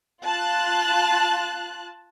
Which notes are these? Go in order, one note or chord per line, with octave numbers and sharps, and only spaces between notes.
F4 A5 F#6